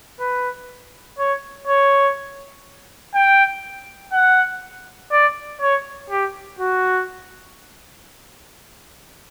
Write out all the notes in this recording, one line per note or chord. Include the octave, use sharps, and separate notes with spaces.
B4
C#5
C#5
G5
F#5
D5
C#5
G4
F#4